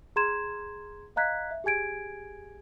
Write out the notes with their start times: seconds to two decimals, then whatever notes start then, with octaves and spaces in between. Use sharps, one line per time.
0.16 G#4 A#5 C6 G#6 E7
1.16 D#5 F5 A#5 F#6 G#6 B6
1.51 E5
1.64 G4 G#4 G#5 G#6 D7